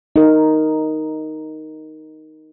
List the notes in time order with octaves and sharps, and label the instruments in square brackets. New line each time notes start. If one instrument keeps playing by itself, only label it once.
[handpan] D#4 A#4